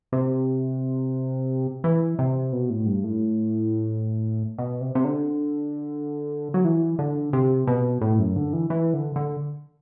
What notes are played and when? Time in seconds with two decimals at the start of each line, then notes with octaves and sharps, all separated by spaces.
0.12 C3
1.84 E3
2.19 C3
2.52 B2
2.70 A2
2.86 G2
3.04 A2
4.58 B2
4.81 C3
4.95 C3
5.04 D3
6.54 F#3
6.65 E3
6.99 D3
7.33 C3
7.67 B2
8.01 A2
8.19 F#2
8.36 D3
8.53 E3
8.70 E3
8.94 D3
9.16 D3